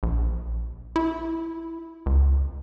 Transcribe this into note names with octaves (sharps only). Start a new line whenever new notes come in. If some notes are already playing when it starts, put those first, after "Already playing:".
A#1
E4
C#2